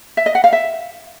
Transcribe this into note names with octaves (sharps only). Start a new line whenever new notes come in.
E5
D#5
F#5
F5
E5